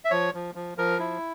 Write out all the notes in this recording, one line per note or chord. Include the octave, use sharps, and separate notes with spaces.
E5
F3 C#5
F3
F3
F3 A#4
E4